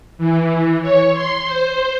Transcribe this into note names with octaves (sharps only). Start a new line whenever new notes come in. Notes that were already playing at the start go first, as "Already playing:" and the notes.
E3
C#5
C6
C5